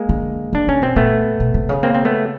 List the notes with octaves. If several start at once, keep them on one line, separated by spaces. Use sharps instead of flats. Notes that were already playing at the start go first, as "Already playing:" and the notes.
Already playing: G#3 A#3
D3
E3 D4
C3 C#4
B2 C4
A#2 A3 B3
B2
C3
C#3
A#3 C4
C4
A3 B3